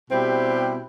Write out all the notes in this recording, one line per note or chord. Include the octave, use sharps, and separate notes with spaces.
B2 G3 C4 E4 G4